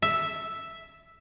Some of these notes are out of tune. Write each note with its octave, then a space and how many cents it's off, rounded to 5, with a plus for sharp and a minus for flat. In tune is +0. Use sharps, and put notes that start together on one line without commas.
E5 +0